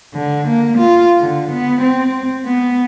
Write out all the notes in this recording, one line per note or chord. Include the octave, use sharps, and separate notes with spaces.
D3
A#3
F4
D3
B3
C4
B3